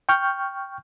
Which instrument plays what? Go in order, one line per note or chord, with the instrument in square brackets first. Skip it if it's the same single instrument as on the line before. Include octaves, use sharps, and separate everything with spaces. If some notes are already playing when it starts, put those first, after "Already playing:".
[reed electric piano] G5 C#6 F6 G6